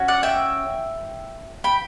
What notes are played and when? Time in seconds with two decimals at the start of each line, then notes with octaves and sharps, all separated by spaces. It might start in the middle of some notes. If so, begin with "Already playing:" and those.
Already playing: C#4 F#4
0.08 D5 F#5
0.23 E5 G5
1.64 G5 B5